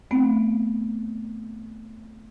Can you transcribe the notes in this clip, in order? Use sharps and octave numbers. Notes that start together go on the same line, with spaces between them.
A3 B3 C4